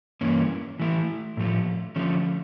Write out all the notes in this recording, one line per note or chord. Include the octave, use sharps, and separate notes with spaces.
G2 E3 A#3 C#4
E3 A3 E4
A2 F3 A3
D3 F3 A3 C#4